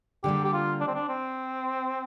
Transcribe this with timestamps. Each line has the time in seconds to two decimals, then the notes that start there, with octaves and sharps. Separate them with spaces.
0.24 D3 G3 A#3 G4
0.44 G4
0.53 F4
0.80 D4
0.87 C4
0.95 D4
1.08 C4